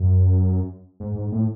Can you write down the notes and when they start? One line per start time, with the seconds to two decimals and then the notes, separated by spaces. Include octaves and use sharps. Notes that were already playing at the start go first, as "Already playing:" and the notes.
Already playing: F#2
1.00 G#2
1.15 G#2
1.32 A2